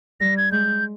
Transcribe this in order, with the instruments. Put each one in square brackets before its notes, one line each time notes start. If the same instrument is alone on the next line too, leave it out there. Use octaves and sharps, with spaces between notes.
[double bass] G3 [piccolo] A#6
[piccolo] G#6
[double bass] G#3 [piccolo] G6